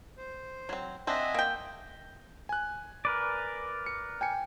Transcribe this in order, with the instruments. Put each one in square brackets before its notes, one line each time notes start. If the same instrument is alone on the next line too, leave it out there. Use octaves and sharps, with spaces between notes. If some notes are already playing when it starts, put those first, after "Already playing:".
[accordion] C5
[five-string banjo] F#3 C4
[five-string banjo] C4 D4 F#5 [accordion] D#5 E5 G#5
[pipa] A#3 G5
[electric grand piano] G#5 F#6
[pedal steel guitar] A#4 B4 D5
[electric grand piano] C#7
G5 G#5 C#7